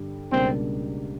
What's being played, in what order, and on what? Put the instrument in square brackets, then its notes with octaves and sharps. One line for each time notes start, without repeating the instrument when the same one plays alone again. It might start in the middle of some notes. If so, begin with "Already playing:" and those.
Already playing: [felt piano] G2 D3 G3
[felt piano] C#2 B2 G3 A#3 D4 [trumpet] C4